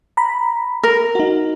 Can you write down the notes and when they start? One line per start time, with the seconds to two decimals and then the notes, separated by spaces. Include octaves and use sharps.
0.17 A#5 B5
0.83 A#4
1.15 D#4 F#4